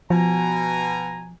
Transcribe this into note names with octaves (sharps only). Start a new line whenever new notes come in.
B2 F3 G#5 A#5